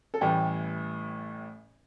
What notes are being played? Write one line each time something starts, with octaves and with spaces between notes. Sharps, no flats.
A4
A1 A2 E3 G3 G4